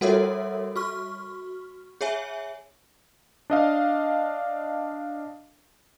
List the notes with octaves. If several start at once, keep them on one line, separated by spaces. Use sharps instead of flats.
G3 F#4 A4 A#4 C#5 E5
F#4 C#6 F6
G#4 C#5 E5 G#5
D4 D#5 F5